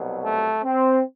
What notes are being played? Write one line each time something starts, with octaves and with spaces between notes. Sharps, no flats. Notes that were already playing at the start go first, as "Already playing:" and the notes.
Already playing: C2 B2 F#3
A3
C4